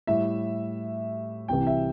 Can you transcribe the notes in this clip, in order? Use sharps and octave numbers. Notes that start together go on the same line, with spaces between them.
A2 G3 E5
C2 C3 E3 G5
E5